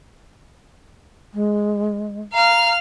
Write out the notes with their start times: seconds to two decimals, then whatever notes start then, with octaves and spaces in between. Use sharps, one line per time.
1.34 G#3
2.33 F5 A#5 F6